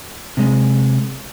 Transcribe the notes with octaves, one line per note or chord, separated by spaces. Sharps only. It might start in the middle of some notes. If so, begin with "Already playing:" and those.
C3 G#3